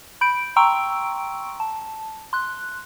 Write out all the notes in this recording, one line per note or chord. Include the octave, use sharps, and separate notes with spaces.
B5 G6 D7
G5 A#5 C6 C#6 E6 D7
A5
C6 F#6